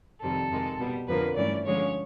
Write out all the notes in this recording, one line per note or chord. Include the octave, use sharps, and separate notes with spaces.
F2 C3 D#3 G3 C4 A4
F2 C3 D#3 G#3
B2 G3 B3
F2 D3 F3 A#3 B4
G2 E3 A3 C#4 D5
D3 F3 G#3 C#4 C#5